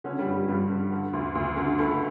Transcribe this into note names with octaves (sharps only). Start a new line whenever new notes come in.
D3 C#4
G3
G2
G3
G2 G3
D3
D3
D2
D2
D3
C#2 A3